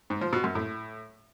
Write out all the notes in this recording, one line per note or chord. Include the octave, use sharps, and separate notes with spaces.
G#2
F3
B2
F#2
A2